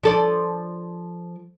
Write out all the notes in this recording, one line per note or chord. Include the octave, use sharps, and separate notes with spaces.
F3 A4 D5